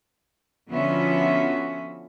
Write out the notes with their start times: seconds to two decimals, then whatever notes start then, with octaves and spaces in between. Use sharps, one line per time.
0.71 D3 F3 B3 C#4 F#4 E5